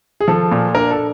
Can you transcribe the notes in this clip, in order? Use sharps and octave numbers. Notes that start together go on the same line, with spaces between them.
G#4
F3 A4
A#2
D4 A#4
A4